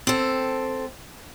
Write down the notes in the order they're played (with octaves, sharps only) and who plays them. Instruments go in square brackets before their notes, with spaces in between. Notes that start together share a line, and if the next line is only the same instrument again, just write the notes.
[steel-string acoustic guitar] C4 A4